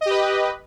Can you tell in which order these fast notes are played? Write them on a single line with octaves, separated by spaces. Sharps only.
D#5 G4 B4